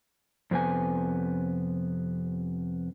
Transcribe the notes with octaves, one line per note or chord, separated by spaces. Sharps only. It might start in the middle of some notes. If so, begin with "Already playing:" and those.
F2 C3 B3 G#5